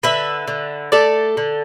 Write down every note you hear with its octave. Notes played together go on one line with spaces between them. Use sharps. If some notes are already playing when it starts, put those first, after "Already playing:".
D3 B4 E5
D3
A3 A4 D5
D3